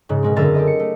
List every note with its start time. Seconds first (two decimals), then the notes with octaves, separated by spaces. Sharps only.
0.09 G#2 C#3
0.23 B2 G#3 C4
0.36 F#1 D3 G#4 A#4 E5 A6
0.54 G4 A4 D#5
0.67 C#7
0.80 A3